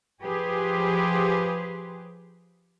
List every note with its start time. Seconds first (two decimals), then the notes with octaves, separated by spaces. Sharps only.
0.23 F3 G4 G#4 B4 C5